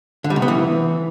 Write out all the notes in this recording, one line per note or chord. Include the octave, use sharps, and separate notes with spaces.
D3
G3
C3
B3
E3